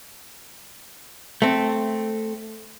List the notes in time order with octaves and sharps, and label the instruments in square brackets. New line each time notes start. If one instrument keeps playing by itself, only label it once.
[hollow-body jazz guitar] A3 C4